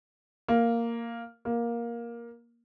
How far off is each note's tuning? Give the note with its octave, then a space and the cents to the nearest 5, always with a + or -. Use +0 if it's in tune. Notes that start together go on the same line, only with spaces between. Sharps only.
A#3 -5
A#3 +10